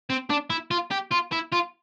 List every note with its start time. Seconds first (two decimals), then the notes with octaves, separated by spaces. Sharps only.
0.10 C4
0.30 D4
0.50 E4
0.71 F4
0.91 G4
1.11 F4
1.32 E4
1.52 F4